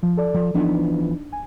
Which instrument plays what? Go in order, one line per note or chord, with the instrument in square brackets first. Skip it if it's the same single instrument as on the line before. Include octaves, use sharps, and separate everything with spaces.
[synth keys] F3
A4 D5
[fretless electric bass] F3
[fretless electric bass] E3 F3 B3 [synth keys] D4 D#4
[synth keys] G#5